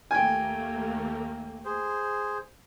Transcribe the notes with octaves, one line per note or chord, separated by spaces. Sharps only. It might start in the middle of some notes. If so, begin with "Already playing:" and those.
D#2 A3 A#3 G5 G#5
G#4 C5